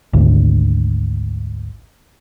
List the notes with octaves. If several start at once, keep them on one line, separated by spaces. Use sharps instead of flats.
G#1 D2